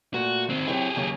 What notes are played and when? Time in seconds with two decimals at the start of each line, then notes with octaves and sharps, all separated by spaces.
0.14 A#2 A3 F#4
0.50 D#3 C4
0.67 F#3 C4 E4 G4 G#4
0.96 D#2 C#3 F#3